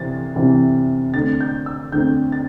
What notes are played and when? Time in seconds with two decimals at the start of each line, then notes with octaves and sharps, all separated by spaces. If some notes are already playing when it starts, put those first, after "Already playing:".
Already playing: C3 E3 C4 A6
0.36 C3 E3 C4
1.14 D3 A3 C4 A6
1.41 G6
1.66 E6
1.92 D3 A3 C4 G6
2.32 A6